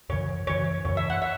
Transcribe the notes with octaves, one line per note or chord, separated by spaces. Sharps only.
F#2 C#3 E3 C#5
F#2 C#3 E3 C#5
F#2 C#3 E3 C#5
E5
F#5
E5